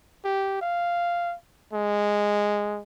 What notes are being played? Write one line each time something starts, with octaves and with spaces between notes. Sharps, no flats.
G4
F5
G#3